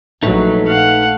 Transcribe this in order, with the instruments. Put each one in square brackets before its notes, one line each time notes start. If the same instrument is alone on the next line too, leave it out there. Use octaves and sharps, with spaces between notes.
[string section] A#1 F#3 [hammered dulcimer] A3 [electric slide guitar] D#4 B4
[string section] F5 [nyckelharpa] F#5